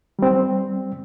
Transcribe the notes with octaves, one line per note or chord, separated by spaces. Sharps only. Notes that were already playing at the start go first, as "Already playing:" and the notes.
G3 C4